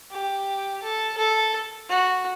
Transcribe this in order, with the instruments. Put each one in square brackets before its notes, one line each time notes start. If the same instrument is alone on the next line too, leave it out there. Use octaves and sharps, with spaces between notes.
[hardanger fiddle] G4
A4
A4
F#4